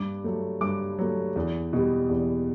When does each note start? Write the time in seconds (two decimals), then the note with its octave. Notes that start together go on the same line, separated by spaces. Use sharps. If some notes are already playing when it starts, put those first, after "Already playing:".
Already playing: G2 D6
0.24 F#3 A3
0.61 G2 D6
0.99 F#3 A3
1.36 E2
1.73 B2 G3
2.10 E2